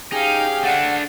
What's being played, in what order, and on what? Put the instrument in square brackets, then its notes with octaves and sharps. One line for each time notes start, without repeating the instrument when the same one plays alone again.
[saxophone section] C#4 G4 G#4 [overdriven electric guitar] D#4 [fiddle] F5 G5
[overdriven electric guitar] A3 D4 [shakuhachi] F#5